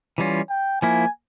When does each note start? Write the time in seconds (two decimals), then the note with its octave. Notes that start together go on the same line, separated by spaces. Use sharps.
0.18 E3 G3 C#4 F4
0.50 G5
0.81 F3 A#3 E4 G#5